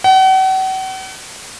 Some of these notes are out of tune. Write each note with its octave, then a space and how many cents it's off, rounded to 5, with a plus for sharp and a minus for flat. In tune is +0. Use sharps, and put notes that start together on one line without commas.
F#5 +40